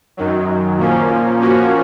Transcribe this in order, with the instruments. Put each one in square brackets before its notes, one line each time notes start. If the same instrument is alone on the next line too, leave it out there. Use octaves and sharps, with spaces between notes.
[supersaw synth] F#2 D#3 F#3
A#2 F3 A#3 C#4
F3 A#3 C#4 F#4